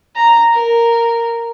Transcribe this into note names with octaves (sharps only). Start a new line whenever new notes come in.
A#5
A#4